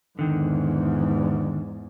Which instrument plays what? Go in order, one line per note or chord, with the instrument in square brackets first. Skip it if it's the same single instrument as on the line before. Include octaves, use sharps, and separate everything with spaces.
[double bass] E2 G#2 [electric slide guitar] D3 D#3